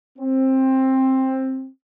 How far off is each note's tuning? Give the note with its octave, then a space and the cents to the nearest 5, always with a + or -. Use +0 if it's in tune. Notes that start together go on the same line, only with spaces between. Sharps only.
C4 +15